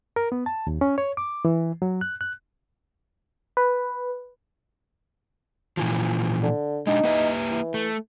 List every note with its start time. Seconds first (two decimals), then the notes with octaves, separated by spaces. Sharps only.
0.16 A#4
0.32 B3
0.46 A5
0.67 D#2
0.81 C#4
0.98 C#5
1.17 D6
1.45 E3
1.82 F#3
2.01 F#6
2.21 F#6
3.57 B4
5.77 A#2 E3 F3
6.42 D3
6.87 G#3 D4 D#4
7.04 A#3 B4 E5
7.51 E3
7.74 A3